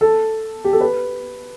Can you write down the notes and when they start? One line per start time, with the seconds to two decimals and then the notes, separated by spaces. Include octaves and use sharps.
0.01 A4
0.64 G4
0.73 A4
0.81 B4